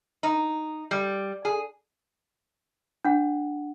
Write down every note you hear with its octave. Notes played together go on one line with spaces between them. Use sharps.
D#4
G3
G#4
D4 F#5